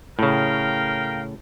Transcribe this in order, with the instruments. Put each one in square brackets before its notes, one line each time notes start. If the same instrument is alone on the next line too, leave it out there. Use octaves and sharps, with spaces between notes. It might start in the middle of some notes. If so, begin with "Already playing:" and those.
[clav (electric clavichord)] A2 C#3 [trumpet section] A#4 F5 G5